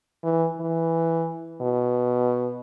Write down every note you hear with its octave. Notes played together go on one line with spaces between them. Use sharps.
E3
E3
B2